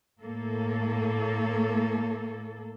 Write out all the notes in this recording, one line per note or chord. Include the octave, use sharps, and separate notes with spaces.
A2 A#3 A4